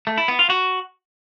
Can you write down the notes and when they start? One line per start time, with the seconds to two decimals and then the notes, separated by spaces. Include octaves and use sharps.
0.07 A3
0.18 E4
0.28 B3
0.39 F4
0.50 F#4